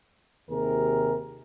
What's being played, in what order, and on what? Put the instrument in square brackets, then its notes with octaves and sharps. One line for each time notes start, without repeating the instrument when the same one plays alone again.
[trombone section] D#2 C3 G#4 A#4